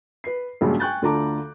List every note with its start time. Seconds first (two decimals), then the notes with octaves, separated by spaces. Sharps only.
0.24 B4 C7
0.61 A#1 G2 C#3 F#3 G#3
0.80 G5 G#5 C#6 F#6 G6 A6
1.02 D2 D3 F4 A5 A#5 D6